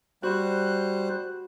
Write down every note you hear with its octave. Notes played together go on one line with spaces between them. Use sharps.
G3 F#4 C5 F#6